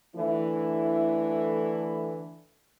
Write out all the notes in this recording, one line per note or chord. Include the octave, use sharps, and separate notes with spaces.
D3 E3 A3 E4